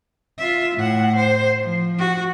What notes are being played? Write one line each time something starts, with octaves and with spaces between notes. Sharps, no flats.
F4 E5
A2 F#5
C5
F3
F#4